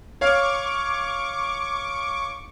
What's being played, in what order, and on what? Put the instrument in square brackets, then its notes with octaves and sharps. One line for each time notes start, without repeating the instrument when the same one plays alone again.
[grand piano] C#5 F5 [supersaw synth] C#6 D6